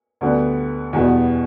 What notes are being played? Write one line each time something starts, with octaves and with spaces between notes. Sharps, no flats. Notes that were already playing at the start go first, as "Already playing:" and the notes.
D2 D3 G3 B3
E2 B2 G3 B3